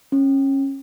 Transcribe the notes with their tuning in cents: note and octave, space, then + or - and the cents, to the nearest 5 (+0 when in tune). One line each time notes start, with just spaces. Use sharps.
C#4 -25